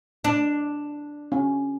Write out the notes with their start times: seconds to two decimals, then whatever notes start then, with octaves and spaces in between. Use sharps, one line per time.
0.24 D4
1.32 C#4